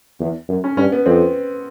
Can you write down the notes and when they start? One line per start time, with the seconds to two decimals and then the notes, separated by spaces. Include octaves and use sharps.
0.20 E2
0.48 F#2
0.64 C#4
0.77 G2 C#4
0.92 B3
1.06 F2 C4